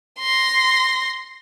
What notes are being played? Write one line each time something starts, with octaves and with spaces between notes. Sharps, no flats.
C6 A#6